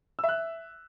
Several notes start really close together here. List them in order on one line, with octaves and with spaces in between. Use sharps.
E6 E5 F#6